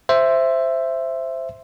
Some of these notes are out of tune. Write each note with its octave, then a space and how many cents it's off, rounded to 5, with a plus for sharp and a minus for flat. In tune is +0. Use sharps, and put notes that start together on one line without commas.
C5 +0 E5 +10